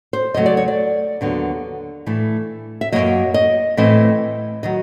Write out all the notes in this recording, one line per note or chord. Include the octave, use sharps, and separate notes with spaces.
C5
E2 C#3 F#3 A3 D#5
D5
C#5
D5
D#2 D3 F#3 B3
A2 E3 A3
E5
F#2 D3 F#3 A#3 D#5
D#5
A2 E3 A3 C4 D#5
D#3 F#3 D#5